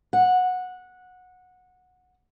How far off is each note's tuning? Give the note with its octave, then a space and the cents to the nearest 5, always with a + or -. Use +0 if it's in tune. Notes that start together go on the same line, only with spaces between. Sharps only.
F#5 -15